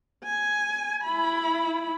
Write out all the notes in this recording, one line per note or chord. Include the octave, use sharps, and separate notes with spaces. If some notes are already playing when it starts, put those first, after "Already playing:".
G#5
E4 B5